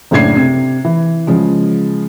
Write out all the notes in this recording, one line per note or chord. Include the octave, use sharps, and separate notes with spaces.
F#1 A2 D4 G#6 C7
C3
E3
C#3 F3 G#3